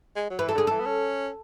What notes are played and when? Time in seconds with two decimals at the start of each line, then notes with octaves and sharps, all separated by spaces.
0.16 G#3
0.30 F#3
0.39 E3 B4
0.49 A4
0.55 D3 G#4
0.67 E3 A4
0.80 B3
0.86 C#4